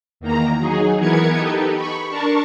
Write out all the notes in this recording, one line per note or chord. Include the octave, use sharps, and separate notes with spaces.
E2 D#3 A#3 A#5
F#3 D#4 G#4
E3 B3 A#4 B4 G#6 C#7
D#4 G4 A4 B4
B5 C#6
D4 A#4 A5 C#6